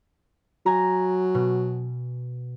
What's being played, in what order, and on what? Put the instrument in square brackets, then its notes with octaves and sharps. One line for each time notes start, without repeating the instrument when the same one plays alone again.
[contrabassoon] F#3 [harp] G#5 A#5
[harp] B2